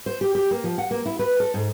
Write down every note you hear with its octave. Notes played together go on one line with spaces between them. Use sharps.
C5
G4
G4
A#3
F3
F#5
A#3
E4
B4
A4
G#2